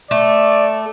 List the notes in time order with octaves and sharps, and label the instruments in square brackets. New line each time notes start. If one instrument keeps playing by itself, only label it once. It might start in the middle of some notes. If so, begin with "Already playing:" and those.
[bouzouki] A3 [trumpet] D5